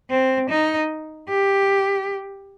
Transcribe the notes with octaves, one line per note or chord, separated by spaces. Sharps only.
C4
D#4
G4